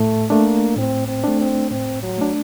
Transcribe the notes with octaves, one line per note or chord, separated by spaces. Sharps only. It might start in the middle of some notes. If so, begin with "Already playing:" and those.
Already playing: A2 A3
A3 A#3 D4
A2 C4
C4
A3 D4
C4
A2 C4
F#3
A3 D4